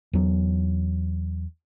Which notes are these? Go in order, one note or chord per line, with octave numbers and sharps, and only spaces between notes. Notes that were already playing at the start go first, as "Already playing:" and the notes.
E2 F#3